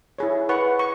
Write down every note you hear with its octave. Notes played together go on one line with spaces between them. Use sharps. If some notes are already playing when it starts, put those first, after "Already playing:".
E4 G#4 C#5
B4 F#5 C#6
C#6